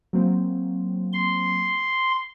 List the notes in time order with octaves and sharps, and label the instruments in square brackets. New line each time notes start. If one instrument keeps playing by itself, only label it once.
[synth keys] F#3 A#3 C4
[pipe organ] C6